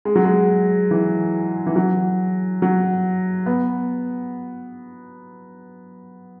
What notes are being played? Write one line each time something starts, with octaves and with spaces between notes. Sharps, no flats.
G#3
F#3
G#3
E3
E3
F#3
F#3
B3